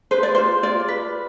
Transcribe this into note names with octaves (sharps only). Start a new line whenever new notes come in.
B4 C5
D5
F4 C5
F4 D5
B4